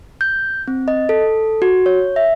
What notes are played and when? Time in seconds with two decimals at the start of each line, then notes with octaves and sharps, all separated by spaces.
0.21 G6
0.68 C4
0.88 D#5
1.09 A4
1.62 F#4
1.86 C#5
2.16 E5